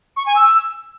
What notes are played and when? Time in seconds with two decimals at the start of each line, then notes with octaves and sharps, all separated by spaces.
0.16 C#6
0.26 G#5
0.35 E6